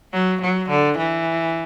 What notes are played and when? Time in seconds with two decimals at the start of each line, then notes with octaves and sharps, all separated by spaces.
0.13 F#3
0.42 F#3
0.69 D3
0.98 E3